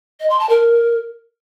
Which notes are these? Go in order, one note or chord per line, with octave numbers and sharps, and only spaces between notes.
D#5
C6
A5
A#4